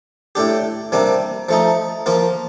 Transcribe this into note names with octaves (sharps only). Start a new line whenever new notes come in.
A2 A3 D4 G4
C3 G3 A#3 D4
F3 A3 D#4
F3 A#3 F4